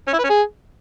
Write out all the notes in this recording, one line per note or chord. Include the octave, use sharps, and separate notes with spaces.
C#4
E4
B4
C#4
G#4